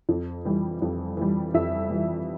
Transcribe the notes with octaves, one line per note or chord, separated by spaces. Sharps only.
F2
E3 G3
F2
E3 G3
F2 E5
E3 G3